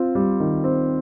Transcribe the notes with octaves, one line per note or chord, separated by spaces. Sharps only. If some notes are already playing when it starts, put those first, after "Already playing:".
Already playing: C4 F4
G3
D#3
C4